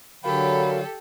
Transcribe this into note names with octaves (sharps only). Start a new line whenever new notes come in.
D3 F#3 F#4 G4 A4 A#4 F5 B5